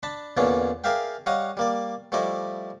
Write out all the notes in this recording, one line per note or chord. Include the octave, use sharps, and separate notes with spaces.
D4 A5 B5
E2 A#2 D3 E3 C#4 D4
G#4 A#4 D5 E5 F5 G5
G3 C#5 D#5 F5 F#5 D#6
G3 A#3 D5
F3 G3 A3 E4 D5 D#5